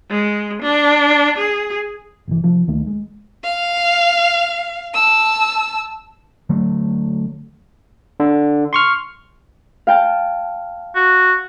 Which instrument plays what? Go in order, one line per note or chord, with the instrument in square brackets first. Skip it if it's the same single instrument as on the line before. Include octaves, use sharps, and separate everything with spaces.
[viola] G#3
D4
G#4
[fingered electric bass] G1 C2 E3
C3 F3
D2 D#3 A3
G#3
[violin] F5
A5 E6
[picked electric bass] D3 F#3 A3
[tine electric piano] D3
C6 C#6 F6
[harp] F5 G5 A5
[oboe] F#4